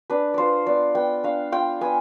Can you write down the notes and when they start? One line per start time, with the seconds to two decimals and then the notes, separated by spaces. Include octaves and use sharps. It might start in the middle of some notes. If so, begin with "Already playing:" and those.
0.10 D4 B4
0.34 F4 C5 D5
0.67 B3 D5
0.95 B3 G5
1.24 D4 F5
1.52 F4 G5
1.81 B3 G#5